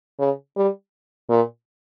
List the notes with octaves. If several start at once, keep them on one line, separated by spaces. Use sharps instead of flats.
C#3
G3
A#2